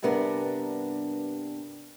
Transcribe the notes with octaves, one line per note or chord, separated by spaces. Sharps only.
G2 C3 G3 B3 D4 A#4